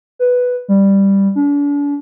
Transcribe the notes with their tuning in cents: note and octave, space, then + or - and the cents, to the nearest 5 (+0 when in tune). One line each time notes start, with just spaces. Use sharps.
B4 +0
G3 +5
D4 -40